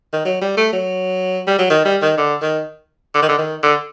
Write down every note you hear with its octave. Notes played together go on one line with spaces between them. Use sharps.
D#3
F#3
G3
A3
F#3
G3
F#3
D#3
G3
D#3
D3
D#3
D3
D#3
D3
D#3
D3